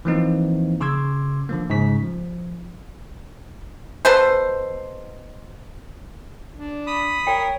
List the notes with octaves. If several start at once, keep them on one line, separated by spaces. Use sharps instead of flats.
E3 F3 A#3 C4 D#4
C#3 C6 D6 E6 G#6
D3 F3 A#3
G#2 C#3 B6
F3
B2 A4 B4 C5
D4
B5 D#6
A#4 C#5 G5